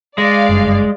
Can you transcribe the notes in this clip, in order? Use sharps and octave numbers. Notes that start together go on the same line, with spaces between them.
G#3 D5 F5
F#1 G2